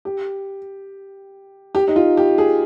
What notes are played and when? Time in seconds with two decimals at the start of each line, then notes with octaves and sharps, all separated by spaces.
0.05 G4
1.75 G4
1.88 D#4
1.96 F4
2.17 G4
2.38 G#4